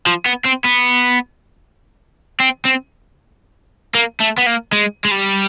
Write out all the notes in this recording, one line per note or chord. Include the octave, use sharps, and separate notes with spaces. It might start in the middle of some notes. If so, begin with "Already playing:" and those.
F3
B3
C4
B3
C4
C4
A#3
A3
B3
A#3
G#3
G#3
G3